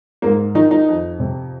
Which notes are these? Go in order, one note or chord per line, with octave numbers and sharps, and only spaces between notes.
G#2 A#3
D#3 D#4
D#4
F2
C3